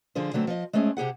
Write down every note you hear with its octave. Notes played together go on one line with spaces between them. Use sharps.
D3 F3 G#4 C5
D3 F#3 A3 C4
F3 D#5
G#3 A3 C4 C#4 G#4
C3 G4 G#4 F#5